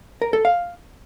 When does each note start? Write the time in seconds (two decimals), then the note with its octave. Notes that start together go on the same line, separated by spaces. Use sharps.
0.22 A#4
0.33 A4
0.45 F5